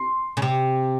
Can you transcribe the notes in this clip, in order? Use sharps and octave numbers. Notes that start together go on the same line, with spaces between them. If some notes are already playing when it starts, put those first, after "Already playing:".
Already playing: C6
C#3
C3